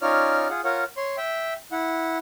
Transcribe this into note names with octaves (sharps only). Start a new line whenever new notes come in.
C#4 D#4 F4 C#5 D5 F6
F4 G#4 F#5
F4 A#4 C#5 F#5
C#5 C6
E5 G5
E4 F#5